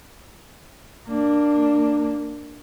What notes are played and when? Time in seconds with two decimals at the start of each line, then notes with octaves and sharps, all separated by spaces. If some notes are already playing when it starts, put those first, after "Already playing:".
1.06 A#3 D4